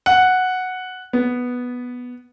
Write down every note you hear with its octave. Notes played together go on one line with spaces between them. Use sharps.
F#5
B3